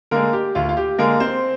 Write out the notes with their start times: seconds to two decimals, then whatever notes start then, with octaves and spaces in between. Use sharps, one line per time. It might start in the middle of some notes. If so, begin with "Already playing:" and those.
0.11 D3 G#3 A#3 A#4
0.33 G4
0.55 D2 F4
0.69 F4
0.77 G4
0.98 D3 G#3 A#3 A#4
1.20 C4 C5